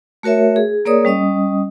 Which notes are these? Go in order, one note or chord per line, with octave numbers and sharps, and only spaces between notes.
A3 F#4 A#4 C#5 E5
G#4
A#3 G#4 A#4 C#5 D5 D#6
G3 C#4 D#5 D#6